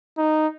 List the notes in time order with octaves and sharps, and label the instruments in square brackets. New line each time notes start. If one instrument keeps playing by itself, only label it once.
[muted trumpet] D#4